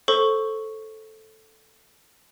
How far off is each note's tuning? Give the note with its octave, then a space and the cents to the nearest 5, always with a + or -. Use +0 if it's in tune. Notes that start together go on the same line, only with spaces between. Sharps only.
A4 +0 C5 +20 C#6 +0